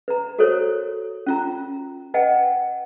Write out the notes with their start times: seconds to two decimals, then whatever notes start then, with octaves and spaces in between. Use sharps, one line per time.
0.08 B4 A#5
0.38 F#4 A4 A#4 C5 C#5
1.27 C#4 F4 A#5
2.14 B4 D#5 F#5 G5 A5